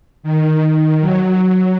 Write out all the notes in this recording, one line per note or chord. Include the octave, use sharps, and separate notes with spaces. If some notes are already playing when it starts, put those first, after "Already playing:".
D#3
F#3
F#3